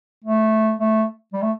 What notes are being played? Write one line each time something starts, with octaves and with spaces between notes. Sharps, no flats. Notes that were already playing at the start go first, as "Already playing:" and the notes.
A3
A3
G3
A3